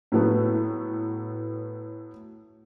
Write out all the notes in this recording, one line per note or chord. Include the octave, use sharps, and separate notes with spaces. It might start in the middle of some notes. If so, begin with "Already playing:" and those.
A2 F#3 A3 B3